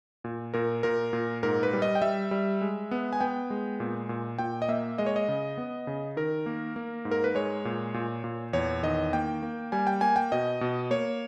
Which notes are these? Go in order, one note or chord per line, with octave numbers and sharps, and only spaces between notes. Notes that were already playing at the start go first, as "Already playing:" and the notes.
A#2
A#2 A#4
A#2 A#4
A#2
G#2 A#4
B4
G3
D#5
G5
G3 E5
G3
G#3
B3
G#5
B3 G5
G#3
A#2
A#2
A#2 G5
D#5
A#3 E5
G#3 D#5
C#5
D#5
C#3
B3
C#3
D#3 A#4
A#3
A#3
G#2
A#4
B4
G#3 C#5
A#2
A#2
A#2
E2 C#5
D#3 D#5
A#3 G5
A#3
G3 G#5
G5
A#3 G#5
G5
B2 D#5
B2
A#3 C#5